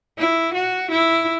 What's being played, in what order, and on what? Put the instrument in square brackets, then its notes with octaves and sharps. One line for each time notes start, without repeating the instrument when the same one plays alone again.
[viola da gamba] E4
F#4
E4